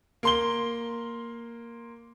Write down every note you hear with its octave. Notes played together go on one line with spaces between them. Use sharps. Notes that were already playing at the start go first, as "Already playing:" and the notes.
A#3 C6 G7